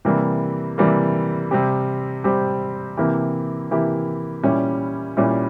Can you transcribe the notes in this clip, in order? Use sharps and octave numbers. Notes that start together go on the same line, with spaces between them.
C3 E3 G3 A#3
C3 E3 G3 A#3
C3 G3 C4 G4
C3 G3 C4 G4
C3 E3 A#3 E4 G4
C3 E3 A#3 E4 G4
A#2 G3 C#4 E4
A#2 G3 C#4 E4